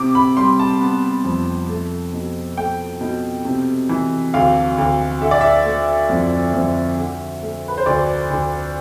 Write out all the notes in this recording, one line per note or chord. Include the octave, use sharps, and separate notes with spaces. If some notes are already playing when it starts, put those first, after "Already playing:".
Already playing: C3 D6
B5
G3 C6
A5
B3
F2
A3
B2
A3 G5
B2
C3
E3
D2 F5
D2
D3 E5
D5
E5
A3
F2
F2
D3
A3
B4
C5
D2 D5
D2